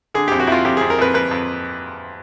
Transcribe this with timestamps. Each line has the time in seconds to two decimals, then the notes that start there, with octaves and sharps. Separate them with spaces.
0.14 D3 G#4
0.28 F2 G4
0.40 F#4
0.47 F2 E4 F4
0.65 F2 G4
0.77 F2 G#4
0.90 A#4
0.99 F2 B4
1.14 F2 B4
1.31 F2